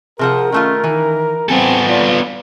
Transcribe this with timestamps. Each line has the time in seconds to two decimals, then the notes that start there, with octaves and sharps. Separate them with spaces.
0.19 C3 F3 G#4 A#4 F#5
0.52 D#3 A3 C#4 F4
0.84 D#3 E3
1.49 B3 C4 A4 G#5
1.88 F4 D5